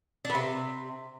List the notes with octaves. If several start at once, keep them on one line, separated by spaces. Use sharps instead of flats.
D4
B3
C3